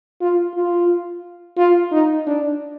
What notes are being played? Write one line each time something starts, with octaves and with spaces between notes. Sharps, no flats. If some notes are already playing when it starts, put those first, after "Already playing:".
F4
F4
F4
D#4
D4